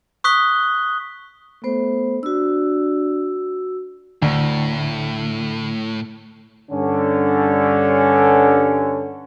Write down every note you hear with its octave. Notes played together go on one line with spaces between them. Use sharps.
C#6 D#6 F#6 B6 G7
A3 B3 C5
D4 F#4 E6
D2 A2 D3
G2 D3 C#4